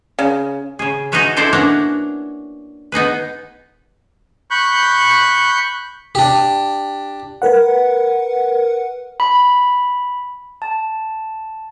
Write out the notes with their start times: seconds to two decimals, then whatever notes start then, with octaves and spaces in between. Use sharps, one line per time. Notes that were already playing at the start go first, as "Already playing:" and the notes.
0.19 C#3
0.79 C#3 G#4
1.12 D#4 F#4 G#4 B4 C#5 E5
1.37 D#4 E4 A4 C5 D5 E5
1.53 A#3 B3 C#4 D4 F#5 A#5
2.92 B3 D#4 G#4 B4
4.51 B5 C#6 F#6 G6
6.15 D4 G4
7.42 A#4 B4 F#5
9.20 B5
10.62 A5